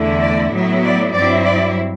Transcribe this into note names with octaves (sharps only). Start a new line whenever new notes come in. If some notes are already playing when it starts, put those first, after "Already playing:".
Already playing: E2 D3 A3 E4
D5
A2 F#3 B3 E4
D5
G2 F#3 C4 E4 D5
D5